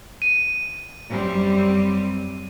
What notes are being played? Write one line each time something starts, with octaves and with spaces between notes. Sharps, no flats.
D#7
F#2 G3 C4